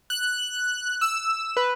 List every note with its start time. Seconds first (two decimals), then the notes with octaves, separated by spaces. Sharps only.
0.10 F#6
1.01 E6
1.57 B4